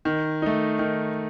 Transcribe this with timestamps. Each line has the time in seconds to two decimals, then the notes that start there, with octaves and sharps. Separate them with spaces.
0.05 D#3
0.42 A3 D#4
0.79 D#3